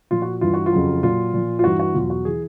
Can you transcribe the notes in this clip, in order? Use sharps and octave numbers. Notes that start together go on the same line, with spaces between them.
A#2 F3 F4
F#4
G2 E3 F4
F#4
F4
F2 C#3 F#3
A#2 F#3 F4
A#2 F3
F4
G2 E3 F#4
F#4
E2 B2 F#3 F4
F#4
E3 G#4